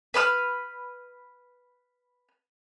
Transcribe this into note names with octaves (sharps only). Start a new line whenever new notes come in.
B4 B5 E6 F6